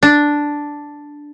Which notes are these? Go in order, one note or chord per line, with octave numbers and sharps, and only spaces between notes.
D4